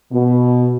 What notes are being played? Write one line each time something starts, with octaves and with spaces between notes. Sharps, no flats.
B2